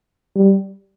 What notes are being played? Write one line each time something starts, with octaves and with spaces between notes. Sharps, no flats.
G3